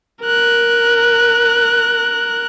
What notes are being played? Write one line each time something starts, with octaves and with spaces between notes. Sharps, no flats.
A#4 F#6